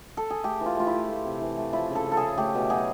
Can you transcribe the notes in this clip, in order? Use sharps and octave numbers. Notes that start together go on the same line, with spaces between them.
A4
G#4
A3 G4
E3
F4
A3 F4
E4
A3
A3
C3
E3
A3
F3 E4
C#3
A4
C#3
A4
C#3 G#4
A3 G4
B2
F#3 G#4